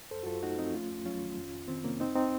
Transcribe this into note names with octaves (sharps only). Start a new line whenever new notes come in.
F#2 A4 C5
F#4
F#2 F4 A4
A3 D#4 F#4
F3 C4 D#4
A3 C#4 F4
F2
F#3 C#4 F4
D#3
F2
F2
D#3 C4
C3 A#3 C#4
F2 C4 D#4
C4 D#4